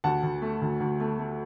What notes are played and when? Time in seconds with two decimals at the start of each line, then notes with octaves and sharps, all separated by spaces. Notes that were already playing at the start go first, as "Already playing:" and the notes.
0.04 D2 F#5 A5
0.23 D2
0.42 A3
0.62 D2
0.80 D2
1.00 A3
1.19 A3